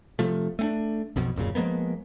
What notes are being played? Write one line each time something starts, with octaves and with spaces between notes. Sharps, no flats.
C3 F3 A3
A3 C4 D4
B1 F2 B2
D1 F#2 A#2 C#3
F3 G#3 A#3 B3